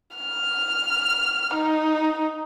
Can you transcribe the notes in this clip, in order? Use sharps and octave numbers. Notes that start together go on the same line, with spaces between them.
F6
D#4